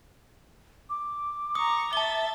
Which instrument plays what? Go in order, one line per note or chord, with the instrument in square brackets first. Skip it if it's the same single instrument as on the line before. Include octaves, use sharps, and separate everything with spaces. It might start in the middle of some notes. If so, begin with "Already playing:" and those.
[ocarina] D6
[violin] A#5 C#6 [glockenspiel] D#6
[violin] E5 A6 [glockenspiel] A5 G7